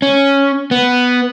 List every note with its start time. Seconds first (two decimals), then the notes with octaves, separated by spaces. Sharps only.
0.02 C#4
0.71 B3